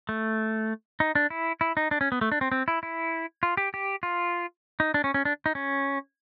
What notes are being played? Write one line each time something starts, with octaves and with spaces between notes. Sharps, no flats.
A3
D#4
D4
E4
E4
D#4
D4
C#4
B3
A3
D4
C4
C4
E4
E4
F4
G4
G4
F4
D#4
D4
C#4
C#4
D4
D#4
C#4